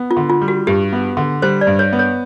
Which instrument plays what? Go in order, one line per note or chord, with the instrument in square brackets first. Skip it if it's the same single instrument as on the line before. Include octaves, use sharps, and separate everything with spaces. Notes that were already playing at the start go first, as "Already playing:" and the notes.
Already playing: [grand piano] B3
[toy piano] F4
[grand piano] D3
[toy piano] F4
[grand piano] G3
[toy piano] F#4
[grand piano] G2 [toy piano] G4
[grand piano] B3
D3
[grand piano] G3 [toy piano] C5
[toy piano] D5
[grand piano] G2
[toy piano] C#5
[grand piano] B3
[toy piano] C#5